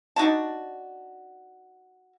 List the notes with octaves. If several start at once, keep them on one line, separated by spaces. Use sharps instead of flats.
D4 D#4 F#4 A5